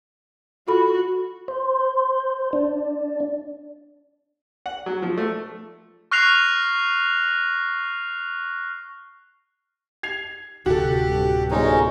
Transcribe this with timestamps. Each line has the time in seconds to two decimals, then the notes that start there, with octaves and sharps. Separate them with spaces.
0.68 F4 F#4 A4 B5
1.48 C5
2.53 D4
4.66 F#5
4.86 F#3
5.02 F3
5.17 A3
6.11 C#6 F6 F#6 A#6 C7 F7
10.03 G#6 C7 F7
10.66 D1 C3 F#4 G4 A4
11.08 G2
11.51 G1 G#3 C#4 D#4